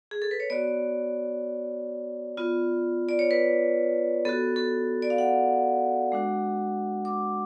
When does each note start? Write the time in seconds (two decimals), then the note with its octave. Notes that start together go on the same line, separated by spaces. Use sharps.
0.11 G#4
0.22 A4
0.31 B4
0.40 C#5
0.50 B3 F#4 D5
2.37 B3 F4
3.09 D5
3.19 C#5
3.31 B4
4.25 B3 F#4 A4
4.56 A4
5.02 D5
5.10 F5
5.18 F#5
6.12 G#3 D4 F#4
7.05 D6